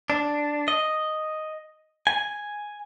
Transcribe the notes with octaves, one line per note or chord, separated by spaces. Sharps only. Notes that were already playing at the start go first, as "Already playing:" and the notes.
D4
D#5
G#5